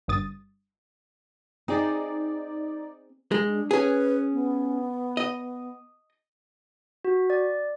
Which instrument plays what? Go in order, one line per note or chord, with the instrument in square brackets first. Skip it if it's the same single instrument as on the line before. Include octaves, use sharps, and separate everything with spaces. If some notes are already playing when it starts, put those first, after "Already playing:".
[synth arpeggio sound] G1 G2 D#6 A6
[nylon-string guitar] C4 G#4 [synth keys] D#4 D5
[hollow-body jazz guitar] G#3
[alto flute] D4
[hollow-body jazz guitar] C#4 G#4 [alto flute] B4
[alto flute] B3
[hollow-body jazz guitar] D#5
[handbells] F#4
D5